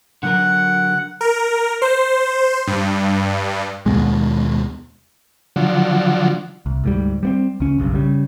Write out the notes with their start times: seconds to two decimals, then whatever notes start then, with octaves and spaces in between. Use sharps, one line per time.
0.23 D3 F#3 A#4 F#5
1.21 A#4
1.82 C5
2.67 G2
3.86 D#2 B2 G#3
5.56 D3 F3 F#3
6.66 C2
6.84 D2 G#2 G3
7.23 G3 B3 C4
7.60 C#2 C#4
7.78 F#1 B1 G2
7.95 C#3 G3